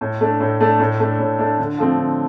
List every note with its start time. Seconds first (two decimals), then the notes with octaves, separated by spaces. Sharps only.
0.01 A2
0.21 A3 D4
0.40 A2
0.61 A3 D4
0.80 A2
1.00 A3 D4
1.19 A2
1.38 A3 D4
1.58 D3
1.78 F3 A3 C4
1.98 D3